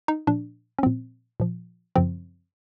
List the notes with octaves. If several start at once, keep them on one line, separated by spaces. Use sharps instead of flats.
D#4
A#2 F3 D4
C#4
A#2 F3 C4
A#2 F3
F#2 C#3 F3 C4